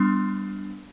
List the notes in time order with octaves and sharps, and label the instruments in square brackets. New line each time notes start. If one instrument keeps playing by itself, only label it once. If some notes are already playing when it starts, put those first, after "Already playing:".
Already playing: [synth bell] G3 B3 D4 C6